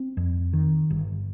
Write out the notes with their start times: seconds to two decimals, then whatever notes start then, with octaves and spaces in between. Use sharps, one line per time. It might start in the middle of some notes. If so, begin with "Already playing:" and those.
Already playing: C4
0.17 F2
0.53 D#3
0.90 G1